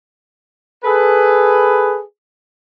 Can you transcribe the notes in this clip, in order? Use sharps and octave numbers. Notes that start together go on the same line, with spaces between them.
G#4 A4 B4